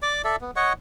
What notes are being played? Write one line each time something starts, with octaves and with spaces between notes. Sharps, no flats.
D5 D6
A4 D5 E5
B3
C#5 D#5 F#5 C#6